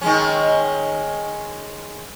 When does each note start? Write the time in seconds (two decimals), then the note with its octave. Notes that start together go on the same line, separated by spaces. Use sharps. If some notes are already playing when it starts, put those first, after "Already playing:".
0.01 D#3 G#3 C#4